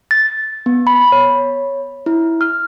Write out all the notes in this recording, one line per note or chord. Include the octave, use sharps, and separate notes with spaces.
A6
B3
B5
C#5
E4
F6